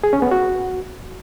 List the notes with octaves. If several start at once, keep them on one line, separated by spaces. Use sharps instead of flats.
G#4
C#4
B3
F#4